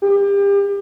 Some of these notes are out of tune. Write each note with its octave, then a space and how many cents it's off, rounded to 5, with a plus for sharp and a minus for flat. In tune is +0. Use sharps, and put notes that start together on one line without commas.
G4 +35